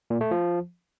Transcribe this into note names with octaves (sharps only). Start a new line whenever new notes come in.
A#2
A3
F3